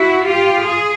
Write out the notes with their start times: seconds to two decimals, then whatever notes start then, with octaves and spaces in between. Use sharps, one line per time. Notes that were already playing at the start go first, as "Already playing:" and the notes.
Already playing: E4 F#4
0.26 F4 G4
0.66 G#4